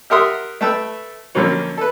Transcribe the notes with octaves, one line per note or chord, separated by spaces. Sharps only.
G4 A#4 E5 F#5 C6 D#6
A3 B4 G5 A5 E6
F2 D3 F#3 A#3 C#4
A4 B4